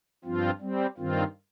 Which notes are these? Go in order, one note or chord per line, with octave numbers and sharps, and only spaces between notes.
G2 F3 C4 F4
G3 C4
G2 D#3 C4 F4